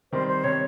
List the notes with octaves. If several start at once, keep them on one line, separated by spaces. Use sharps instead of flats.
D#3 G3 C4 C5
C5
D#3 G3 C4 C#5